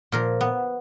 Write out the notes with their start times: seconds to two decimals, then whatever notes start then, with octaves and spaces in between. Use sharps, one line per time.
0.12 A#2 F3 A#4
0.41 B3